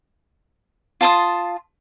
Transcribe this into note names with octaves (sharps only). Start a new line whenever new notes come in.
F4 A5 C6 D#6